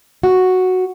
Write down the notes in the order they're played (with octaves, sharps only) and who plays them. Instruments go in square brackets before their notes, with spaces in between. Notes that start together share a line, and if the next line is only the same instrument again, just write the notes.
[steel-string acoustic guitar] F#4